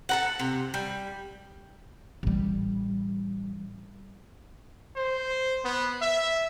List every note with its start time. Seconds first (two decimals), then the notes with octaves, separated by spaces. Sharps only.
0.09 A4 A#4 F#5
0.39 C3
0.74 G3
2.23 A1 G3
4.96 C5
5.64 B3
6.01 E5